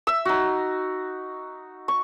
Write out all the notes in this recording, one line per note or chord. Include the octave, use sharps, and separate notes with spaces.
E5 E6
D#4 F#4
C#6